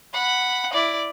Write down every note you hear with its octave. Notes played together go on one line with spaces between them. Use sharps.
F#5 B5
E4 D5